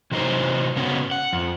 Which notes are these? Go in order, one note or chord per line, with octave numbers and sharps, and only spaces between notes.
C3 E3 F#3 D#4 A#4 C5
C#3 B3 C#4 F#4
F#5
F2